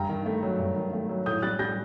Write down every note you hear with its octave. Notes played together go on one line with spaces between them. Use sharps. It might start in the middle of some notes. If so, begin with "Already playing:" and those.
Already playing: G2 G5 A#5
D#3
A3
F#3
G2
D#3
A3
F#3
A2 D#6 G6
G3 F#6 A6
G3 G6 A#6